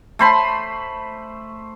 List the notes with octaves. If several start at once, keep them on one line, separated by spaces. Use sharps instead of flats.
A3 C5 B5 C6